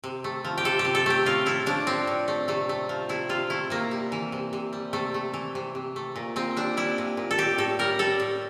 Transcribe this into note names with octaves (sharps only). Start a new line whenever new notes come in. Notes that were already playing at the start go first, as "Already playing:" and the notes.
C3
A3
F3
G4
C3 A4
G4
C3
A4
A3 G4
A2 F4
A3 E4
F3 D4
A2 C4
A2
A3
C3 A3
A3
F3
C3 E4
C3 F4
A3 E4
C3 A#3
G3
E3
C3
C3
G3
C3 A3
A3
E3
C3
C3
A3
A#2
A#2 C4
G3 D4
G3 E4
A#2
A#2
A4
A2 G4
A2 A4
G3 A#4
G3 A4
A2